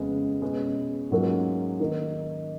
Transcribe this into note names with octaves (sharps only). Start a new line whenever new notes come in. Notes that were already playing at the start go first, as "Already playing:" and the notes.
Already playing: F2 C#3 G#3 B3
B2 G#3 C#4 G#4 B4
G#2 F#3 A#3 C#4 F4
D#3 A#3 D#4